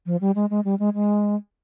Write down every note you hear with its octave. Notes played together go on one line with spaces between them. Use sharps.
F3
G3
G#3
G#3
G3
G#3
G#3